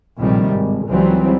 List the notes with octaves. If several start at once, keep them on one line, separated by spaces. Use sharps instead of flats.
A#1 A2 C3 D#3 G3
G#1
C#2 E3 F#3 G3 C4